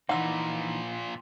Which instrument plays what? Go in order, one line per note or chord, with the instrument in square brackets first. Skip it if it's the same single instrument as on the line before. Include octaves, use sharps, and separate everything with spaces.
[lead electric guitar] A#2 F3 [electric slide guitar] E3 D#4 [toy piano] F#5 E6